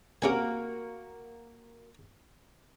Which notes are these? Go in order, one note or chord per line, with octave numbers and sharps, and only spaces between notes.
C3 A#3 C#4 F#4 A#4 G#5